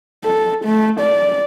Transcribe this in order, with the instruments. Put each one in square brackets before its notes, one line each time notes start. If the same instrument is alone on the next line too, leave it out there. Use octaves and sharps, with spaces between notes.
[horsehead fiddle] A4
A3
D5